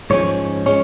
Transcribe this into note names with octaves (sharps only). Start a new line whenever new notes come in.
G#2 F3 G#3 C#4 C#5
G#3 C#4 C#5